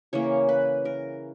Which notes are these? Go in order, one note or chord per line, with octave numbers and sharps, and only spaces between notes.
C#3 E3 A#3 C#5
B4
A#4